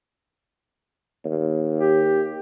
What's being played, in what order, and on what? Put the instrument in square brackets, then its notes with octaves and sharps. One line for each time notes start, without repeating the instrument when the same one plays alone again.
[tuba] D#2
[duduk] G4